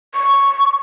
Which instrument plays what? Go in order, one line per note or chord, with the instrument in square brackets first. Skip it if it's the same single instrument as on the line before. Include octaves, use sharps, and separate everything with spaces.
[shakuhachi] C#6